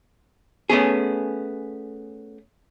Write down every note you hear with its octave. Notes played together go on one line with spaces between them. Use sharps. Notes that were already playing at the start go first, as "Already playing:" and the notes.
A3 B3 C#4 G#4